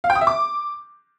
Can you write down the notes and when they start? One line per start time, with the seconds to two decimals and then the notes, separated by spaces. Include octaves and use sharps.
0.04 F5
0.10 G5
0.15 D#6
0.21 E5
0.27 D6